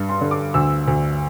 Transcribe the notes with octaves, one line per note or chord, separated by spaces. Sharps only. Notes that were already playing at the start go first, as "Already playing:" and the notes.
Already playing: G2
C6
D3
D6
D2 E6
D2